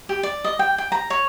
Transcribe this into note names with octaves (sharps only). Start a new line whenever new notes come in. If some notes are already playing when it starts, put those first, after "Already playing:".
G4
D5
D#5
G5
G5
A#5
C#5